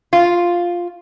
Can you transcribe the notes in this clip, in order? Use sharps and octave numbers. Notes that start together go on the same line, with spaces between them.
F4